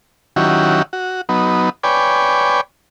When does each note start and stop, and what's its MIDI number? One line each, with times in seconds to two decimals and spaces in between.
0.36 0.82 51
0.36 0.82 54
0.36 0.82 61
0.36 0.82 64
0.36 0.82 66
0.36 0.82 67
0.93 1.21 66
1.29 1.70 54
1.29 1.70 59
1.29 1.70 63
1.83 2.61 71
1.83 2.61 73
1.83 2.61 74
1.83 2.61 79
1.83 2.61 80